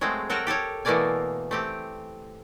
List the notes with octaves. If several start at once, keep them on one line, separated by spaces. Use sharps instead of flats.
F#3 G#3 A3 C4
F#3 F#4 A4 A#4 G5
G4 A4 A#4 C#5
B2 E3 A3 A#3 D5 G#5
A3 C4 G4